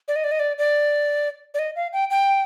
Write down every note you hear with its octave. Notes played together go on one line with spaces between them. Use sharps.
D5
D#5
D5
D#5
D5
D5
D5
D#5
F5
G5
G5